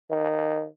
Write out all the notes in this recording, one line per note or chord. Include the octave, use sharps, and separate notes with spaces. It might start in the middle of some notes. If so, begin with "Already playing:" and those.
D#3